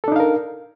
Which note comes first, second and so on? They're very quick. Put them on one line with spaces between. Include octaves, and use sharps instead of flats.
A4 D4 D#4 F5 A#4